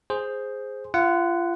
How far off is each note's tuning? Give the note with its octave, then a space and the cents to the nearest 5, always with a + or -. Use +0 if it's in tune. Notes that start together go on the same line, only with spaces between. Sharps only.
G#4 +0 C5 +0
F4 -30 F#5 +5